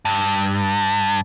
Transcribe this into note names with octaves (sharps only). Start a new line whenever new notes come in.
G2